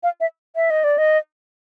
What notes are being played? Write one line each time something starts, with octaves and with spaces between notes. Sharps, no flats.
F5
E5
E5
D#5
D5
D#5